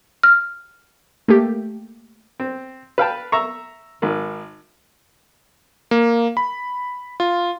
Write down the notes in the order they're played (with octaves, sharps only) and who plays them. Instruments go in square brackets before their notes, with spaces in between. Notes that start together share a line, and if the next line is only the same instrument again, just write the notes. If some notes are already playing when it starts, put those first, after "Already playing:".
[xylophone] F6
[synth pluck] A3 A#3 G4
[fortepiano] C4
B4 F5 G5 A5
E5 A#5 C#6
G#1 D#3
[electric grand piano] A#3
B5
F4